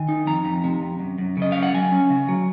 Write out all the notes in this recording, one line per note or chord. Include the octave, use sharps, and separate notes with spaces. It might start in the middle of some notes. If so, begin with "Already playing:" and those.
Already playing: D#3 G#5
D#4
F2 A#5
F2
C3
F2
F#2
F#2
C#3 D#5
F#2 F5
F#5
F#3 G#5
C#4
C#3
F#3